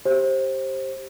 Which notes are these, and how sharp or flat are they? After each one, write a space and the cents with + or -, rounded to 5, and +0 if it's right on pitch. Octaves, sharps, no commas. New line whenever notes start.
G4 -5 C5 +25